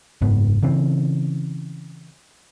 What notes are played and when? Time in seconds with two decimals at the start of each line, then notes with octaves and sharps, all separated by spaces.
0.21 F#1 G#2 B3
0.63 C#3 E3 C4